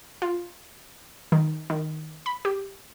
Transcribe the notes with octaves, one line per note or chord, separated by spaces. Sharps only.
F4
D#3
D#3
B5
G4